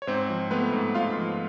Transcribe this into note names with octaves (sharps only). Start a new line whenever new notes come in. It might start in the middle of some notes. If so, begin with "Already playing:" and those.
C#5
G#2 C4 C5
F3
A3 B3 B4
G#2
G#2 F4 F5
F3